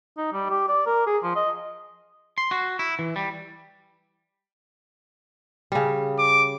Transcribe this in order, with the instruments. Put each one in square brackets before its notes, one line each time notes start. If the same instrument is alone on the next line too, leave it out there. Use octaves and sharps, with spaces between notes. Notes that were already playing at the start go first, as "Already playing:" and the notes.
[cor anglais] D#4
G3
G4
D5
A#4
G#4
F3
D#5
[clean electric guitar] C6
F#4
E4
E3
G3
[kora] C#3 G3
[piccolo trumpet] D6